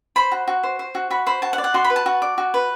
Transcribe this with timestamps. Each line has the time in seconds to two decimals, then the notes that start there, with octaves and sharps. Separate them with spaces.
0.16 C5 B5
0.32 F#4
0.48 F#4
0.63 C5
0.79 C5
0.95 F#4
1.11 F#4 B5
1.27 C5 B5
1.42 F#4 A5
1.53 F#5
1.58 D5
1.64 F#5
1.74 F#4 C6
1.84 B5
1.90 B4
1.96 A5
2.06 F#4
2.22 D5
2.38 F#4
2.54 B4